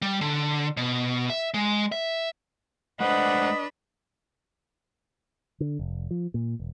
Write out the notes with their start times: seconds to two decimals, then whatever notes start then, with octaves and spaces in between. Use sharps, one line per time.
0.02 G3
0.21 D3
0.77 B2
1.30 E5
1.54 G#3
1.92 E5
3.00 G#3 A3 D4 B4 C5 D#5 F#5
5.60 D3
5.79 F1
6.11 F3
6.34 A#2
6.60 E1